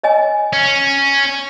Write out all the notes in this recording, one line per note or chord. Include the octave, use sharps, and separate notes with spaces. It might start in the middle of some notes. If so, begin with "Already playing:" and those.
C#5 D#5 G#5
C#4